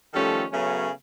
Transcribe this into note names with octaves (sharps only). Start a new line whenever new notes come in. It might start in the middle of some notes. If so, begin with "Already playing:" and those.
D#3 F3 G3 A3 C#4 A4
C#3 F#3 A3 B3 C#4